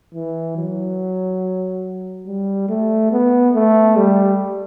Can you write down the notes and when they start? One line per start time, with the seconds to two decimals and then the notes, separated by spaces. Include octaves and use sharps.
0.15 E3
0.57 F#3
2.27 G3
2.69 A3
3.12 B3
3.55 A3
3.97 G3